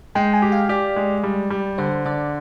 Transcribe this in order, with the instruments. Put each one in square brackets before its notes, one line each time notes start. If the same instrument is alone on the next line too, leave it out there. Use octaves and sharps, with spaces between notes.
[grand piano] G#3 [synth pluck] G5
[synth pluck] G#5
[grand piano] G4
[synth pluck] F5
[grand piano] G4 [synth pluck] D5
[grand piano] G#3
G3
G3
[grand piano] D3 [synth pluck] C5
[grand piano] D3 [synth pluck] D5